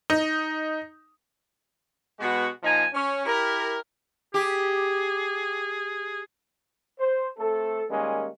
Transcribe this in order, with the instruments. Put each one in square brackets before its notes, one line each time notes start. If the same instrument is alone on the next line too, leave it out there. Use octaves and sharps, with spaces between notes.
[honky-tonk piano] D#4
[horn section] B2 G#3 B3 F#4
A#2 F3 D#4 G#5 A#5
C#4
E4 G4 A#4
[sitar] G4 [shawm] G#4
[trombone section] C5
A3 C4 A4
D#3 G3 G#3 A#3 C#4